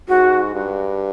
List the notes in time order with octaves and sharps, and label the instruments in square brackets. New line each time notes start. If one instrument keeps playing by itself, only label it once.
[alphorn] G#2 [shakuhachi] F#4
[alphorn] G2